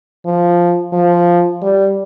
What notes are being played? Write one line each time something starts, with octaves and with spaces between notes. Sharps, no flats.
F3
F3
G3